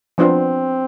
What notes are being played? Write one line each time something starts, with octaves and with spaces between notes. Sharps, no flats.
F3 B3 C4 D4 F4 C5